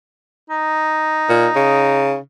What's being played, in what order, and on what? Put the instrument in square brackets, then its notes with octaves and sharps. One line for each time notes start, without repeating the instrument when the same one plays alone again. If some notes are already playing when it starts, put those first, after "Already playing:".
[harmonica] D#4
[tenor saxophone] A#2
C#3